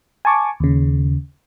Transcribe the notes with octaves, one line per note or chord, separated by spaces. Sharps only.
G#5 A5 C#6 D6
D#2 C#3